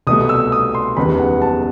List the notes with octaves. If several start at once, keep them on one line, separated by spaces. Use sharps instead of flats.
C2 B2 A3 D#6
E6
D#6
C6
F#1 E2 D#3 G3 B3 B5
F#5
A5